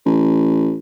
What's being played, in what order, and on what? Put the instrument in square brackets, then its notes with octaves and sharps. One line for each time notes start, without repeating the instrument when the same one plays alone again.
[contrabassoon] A1